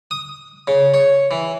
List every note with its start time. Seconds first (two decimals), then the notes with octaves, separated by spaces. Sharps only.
0.11 D#6
0.68 C#3
0.94 C#5
1.31 E3